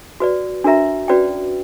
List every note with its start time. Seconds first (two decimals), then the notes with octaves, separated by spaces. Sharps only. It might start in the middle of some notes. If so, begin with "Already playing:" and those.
0.20 F#4 B4 D5
0.64 D4 F#4 A#4 E5 A#5
1.08 C#4 F#4 B4 D5 G5